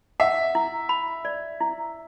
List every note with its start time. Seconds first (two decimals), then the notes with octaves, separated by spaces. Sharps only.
0.20 E5 F#5
0.55 E4
0.89 B5
1.25 D5
1.61 E4